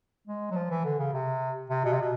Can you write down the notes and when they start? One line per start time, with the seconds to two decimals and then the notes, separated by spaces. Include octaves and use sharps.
0.28 G#3
0.51 F#3
0.56 F3
0.70 E3
0.85 D3
0.99 C#3
1.13 C3
1.70 C3
1.84 B2
1.93 C3
2.01 B2